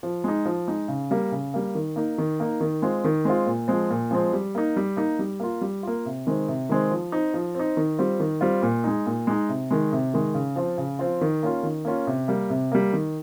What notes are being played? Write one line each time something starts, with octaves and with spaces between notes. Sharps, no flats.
F3
G#3 D#4
F3
G#3 D#4
C#3
G3 A#3
C#3
G3 A#3
D#3
A#3 D#4
D#3
A#3 D#4
D#3
G#3 C4 F4
D#3
G#3 C4 F4
A#2
F3 G#3 C4
A#2
F3 G#3 C4
G3
A#3 D#4
G3
A#3 D#4
G3
A#3 F4
G3
A#3 F4
C3
D#3 G#3 C4
C3
D#3 G#3 C4
F3
C4 D#4
F3
C4 D#4
D#3
G3 C4 F4
D#3
G3 C4 F4
A#2
G#3 D#4
A#2
G#3 D#4
C3
D#3 G#3
C3
D#3 G#3
C#3
F3 C4 F4
C#3
F3 C4 F4
D#3
A#3 C#4 F4
D#3
A#3 C#4 F4
C3
G3 A#3
C3
G3 A#3
D#3